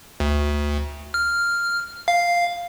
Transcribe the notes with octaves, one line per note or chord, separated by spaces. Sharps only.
D2
F6
F5